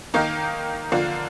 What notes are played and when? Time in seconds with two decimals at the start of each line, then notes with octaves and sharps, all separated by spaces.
0.14 D#3 A#3 D#4
0.92 D3 F3 A#3 D4 F4